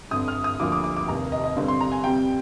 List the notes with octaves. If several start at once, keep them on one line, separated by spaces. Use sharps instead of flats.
G1 F2 D3 D#6
F6
D#6
D2 D3 F3 A#3 D6
D6
D6
D6
F1 D#2 D#3 A#5
D#5
D#5
G2 D3 G3 C4
C6
A#5
G#5
F2 C3 G3 G5